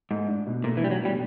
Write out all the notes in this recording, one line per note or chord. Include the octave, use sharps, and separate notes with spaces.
G#2 A3
D4
B2
A#2 A3
E3
G3 D4
F#3
B2
G3